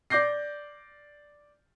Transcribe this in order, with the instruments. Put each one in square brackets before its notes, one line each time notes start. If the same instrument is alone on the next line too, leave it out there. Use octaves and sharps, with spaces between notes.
[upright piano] D5 D6 G6 A#6 C7